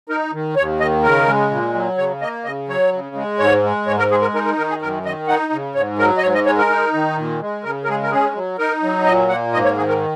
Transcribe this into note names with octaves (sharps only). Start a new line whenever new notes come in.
D#4 A#4
D#3
D#2 C#5
D#3 D#5
C#3 A#4
G#3
A#2
F#3
C#3 C#5
A#3 D#5
C#3 D#5
F#3 C#5
C#3
G#3
G#2 C#5
G#3
G#2 C#5
A#4
G#3 G#4
A#4
D#4 A#4
A#4
D#3 A#4
G#4
F#2 A#4
D#3 D#5
D#4 F#5
C#3
G#2 C#5
F#3 A#4
D#5
G#2 C#5
D#5
G#3 C#5
A#4
D#4
D#3
A#2
G#3
C#3 A#4
A#4
G#3 G#4
A#4
C#4 G#4
F#3
D#4 A#4
F#3
A#2 D#5
A#3 F#5
G#2 D#5
C#5
D#3 G#4
A#4